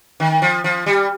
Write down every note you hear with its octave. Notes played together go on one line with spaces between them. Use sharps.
D#3
F3
F3
G3